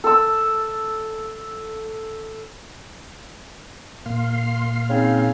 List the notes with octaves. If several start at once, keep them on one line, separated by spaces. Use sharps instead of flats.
A4 E6
A#2 F5 C6
C#3 C4 D#4